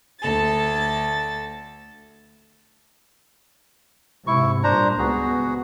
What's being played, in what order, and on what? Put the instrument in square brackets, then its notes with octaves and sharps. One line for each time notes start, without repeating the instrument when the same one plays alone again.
[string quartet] D2 A4 A6
[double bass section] G#2 C3 [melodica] E4 C#6
[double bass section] G2 A#2 [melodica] D4 C5 A#5
[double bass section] C#2 B3 [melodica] F#4 G#4